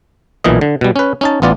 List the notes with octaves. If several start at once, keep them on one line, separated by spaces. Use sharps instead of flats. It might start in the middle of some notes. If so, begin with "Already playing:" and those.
B1 A#2 E3 D#5
D3
B2 G3
C#4 B4
C#4 D#4 A5
A1 B3 F4 D5